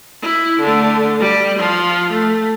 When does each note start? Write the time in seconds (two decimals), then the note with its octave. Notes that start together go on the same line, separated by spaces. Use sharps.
0.22 E4
0.59 D3 A3
1.20 G3
1.58 F3 F4
2.11 A3